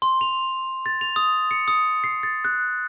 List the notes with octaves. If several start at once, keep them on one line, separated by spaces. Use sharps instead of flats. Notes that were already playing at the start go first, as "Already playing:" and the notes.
C6
F7
A6
F7
D#6
C#7
D#6
C7
A6
F#6